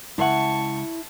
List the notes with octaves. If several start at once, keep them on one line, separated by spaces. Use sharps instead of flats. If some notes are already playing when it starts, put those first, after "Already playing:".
C#2 E4 E5 F#5 A5 C#6